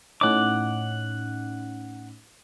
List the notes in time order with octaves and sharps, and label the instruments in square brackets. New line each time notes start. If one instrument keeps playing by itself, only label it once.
[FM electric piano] A2 C#4 D#4 [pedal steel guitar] F#5 D6